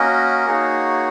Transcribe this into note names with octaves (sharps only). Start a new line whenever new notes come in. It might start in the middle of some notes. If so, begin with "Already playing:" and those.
Already playing: A#3 C#4 F#4 A#4 D#5
A#3 D#4 F#4 G#4 C#5